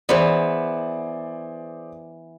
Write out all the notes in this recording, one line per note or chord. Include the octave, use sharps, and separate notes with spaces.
E3 B3 G#4 C5 D5